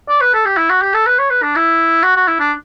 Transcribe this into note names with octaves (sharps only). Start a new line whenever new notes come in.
D5
B4
A4
G4
E4
F#4
G4
A4
B4
C#5
B4
D4
E4
F#4
F#4
E4
D4